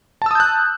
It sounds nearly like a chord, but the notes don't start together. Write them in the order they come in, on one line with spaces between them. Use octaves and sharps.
A5 E6 D#6 G6 F#6